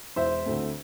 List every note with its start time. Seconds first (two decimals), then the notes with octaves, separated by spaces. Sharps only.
0.16 E1 C5 E5
0.45 D2 D3 A3 C4